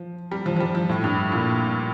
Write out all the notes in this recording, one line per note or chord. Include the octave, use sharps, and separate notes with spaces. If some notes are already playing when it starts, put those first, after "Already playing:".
Already playing: F3
G3
F3
F3
G3
F3
A2
G2
A#2